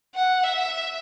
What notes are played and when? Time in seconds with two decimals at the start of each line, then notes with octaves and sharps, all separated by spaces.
0.15 F#5
0.44 E5